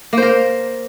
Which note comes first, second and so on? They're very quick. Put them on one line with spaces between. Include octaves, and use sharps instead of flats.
A#3 C5 A#4